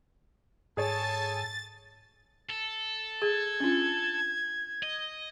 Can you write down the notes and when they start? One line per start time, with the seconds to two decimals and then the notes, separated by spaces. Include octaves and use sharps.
0.77 G#2 G#4 A4 C#5 G#5 A5 A6
2.49 A4
3.22 G#4 G#6
3.60 C#4 D4 F4
4.83 D#5